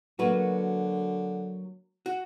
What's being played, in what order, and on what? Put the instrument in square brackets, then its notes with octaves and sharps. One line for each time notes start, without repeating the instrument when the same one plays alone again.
[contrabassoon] D3 [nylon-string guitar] F#3 A#3 [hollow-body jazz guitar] F#4 B4
[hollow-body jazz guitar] F#4